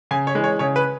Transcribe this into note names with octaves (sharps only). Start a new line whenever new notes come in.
C#3 G#5
C#5
E3 G#3
C#5
C#3 C#5
B4